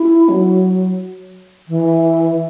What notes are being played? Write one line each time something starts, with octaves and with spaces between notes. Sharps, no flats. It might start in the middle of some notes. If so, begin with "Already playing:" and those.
Already playing: E4
F#3
E3